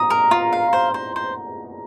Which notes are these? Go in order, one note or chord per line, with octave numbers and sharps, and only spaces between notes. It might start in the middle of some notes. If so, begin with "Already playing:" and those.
Already playing: A#5 D#6
A#4
F4
F5
C5
C5
C5